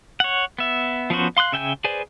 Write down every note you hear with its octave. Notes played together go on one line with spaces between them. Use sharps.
C#5 F#5
B3 E5
F3 B3 C#4 F#4 C5
F5 C6 D6 F#6
C#3 E5 G5 G#5 G6
G#4 B4 C5 D5 G#5